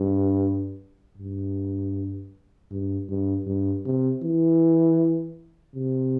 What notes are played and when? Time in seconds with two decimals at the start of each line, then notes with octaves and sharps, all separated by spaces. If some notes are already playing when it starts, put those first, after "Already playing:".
Already playing: G2
1.18 G2
2.71 G2
3.09 G2
3.46 G2
3.85 C3
4.23 E3
5.75 C3